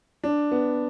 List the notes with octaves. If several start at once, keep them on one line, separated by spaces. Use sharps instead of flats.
D4
B3